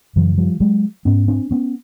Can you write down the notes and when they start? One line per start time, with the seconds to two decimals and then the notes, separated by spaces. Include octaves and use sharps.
0.16 F#2 C#3 E3 F#3
0.38 F3 G3
0.60 F#3 G#3
1.05 G#2 B3 C#4
1.28 C4 D4
1.51 B3 C#4